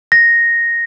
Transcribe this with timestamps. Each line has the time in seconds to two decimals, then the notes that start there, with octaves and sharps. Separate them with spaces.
0.12 A#6